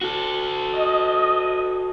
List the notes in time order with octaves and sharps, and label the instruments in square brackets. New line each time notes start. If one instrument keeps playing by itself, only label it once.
[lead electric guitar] F#4 A4
[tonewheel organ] D#5